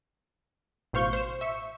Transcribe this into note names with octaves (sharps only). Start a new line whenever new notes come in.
A1 B2 C5 F5 C#6 G6
C5 E7
E5 C#6